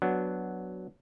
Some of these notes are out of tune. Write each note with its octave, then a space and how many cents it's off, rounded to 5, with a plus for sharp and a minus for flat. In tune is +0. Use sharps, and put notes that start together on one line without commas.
F#3 +0 B3 -5 D4 +0